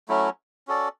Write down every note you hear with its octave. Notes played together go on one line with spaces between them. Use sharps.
F#3 A3 C#4 E4
C#4 F#4 A4 D5